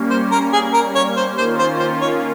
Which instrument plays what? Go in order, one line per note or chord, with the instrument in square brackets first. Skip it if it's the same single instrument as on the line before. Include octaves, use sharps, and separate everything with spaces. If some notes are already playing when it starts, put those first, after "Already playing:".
Already playing: [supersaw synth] G3 A#3 C#4
[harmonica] C5
A#4
G#4
A#4
C#5
C5
[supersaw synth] D#3 A#3 C#4 F4 [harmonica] C5
[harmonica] C5
C5
C#5